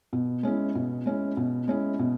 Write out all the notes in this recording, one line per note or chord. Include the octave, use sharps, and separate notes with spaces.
B2
G#3 C#4 E4
B2
G#3 C#4 E4
B2
G#3 C#4 E4
B2